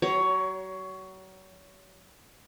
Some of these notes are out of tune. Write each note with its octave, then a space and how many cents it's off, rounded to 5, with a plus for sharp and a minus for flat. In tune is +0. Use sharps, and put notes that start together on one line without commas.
F#3 +35 C#5 +15